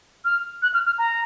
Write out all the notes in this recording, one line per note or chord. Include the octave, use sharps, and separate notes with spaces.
F6
F#6
F6
F6
A#5